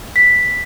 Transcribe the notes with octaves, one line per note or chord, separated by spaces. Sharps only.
B6